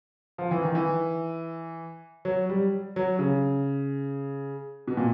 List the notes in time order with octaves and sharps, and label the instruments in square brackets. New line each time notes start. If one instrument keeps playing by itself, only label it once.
[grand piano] F3
E3
D#3
E3
F#3
G3
F#3
C#3
B2
A#2